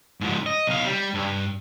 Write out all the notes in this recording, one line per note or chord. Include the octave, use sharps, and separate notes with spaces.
G#2 F3
D#5
B1 F5
G3
G2